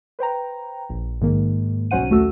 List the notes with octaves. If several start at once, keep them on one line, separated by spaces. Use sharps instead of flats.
B4 C5 G5 A#5
A#1
G#2 D#3 A#3
B1 F#3 C#4 C5 F#5 D#7
D#2 A3 F#4 E6